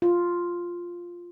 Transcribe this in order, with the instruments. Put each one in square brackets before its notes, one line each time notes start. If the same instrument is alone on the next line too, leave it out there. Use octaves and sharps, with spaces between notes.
[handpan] F4